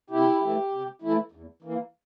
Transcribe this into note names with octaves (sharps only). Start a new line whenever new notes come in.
C3 E4 G4
E3 A3 E4
C3
E3 A3 E4
E2
E3 A#3